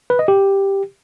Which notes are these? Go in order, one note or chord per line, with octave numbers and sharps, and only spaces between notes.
B4
D#5
G4